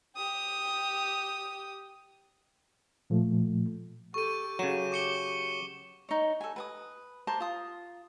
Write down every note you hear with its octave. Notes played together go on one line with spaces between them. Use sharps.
G4 D#6
A#2 F3 A3
G4 A4 C#6 D#7
C#3 F#3 G4 E7
D6 C#7 G7
D#4 C#5
A4 G#5
B4 G#5 D#6
A#4 C5 A5 D6
F4 D#6